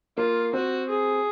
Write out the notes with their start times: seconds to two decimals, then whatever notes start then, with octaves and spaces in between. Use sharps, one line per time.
0.17 A#3 F4
0.53 C4 F#4
0.89 G#4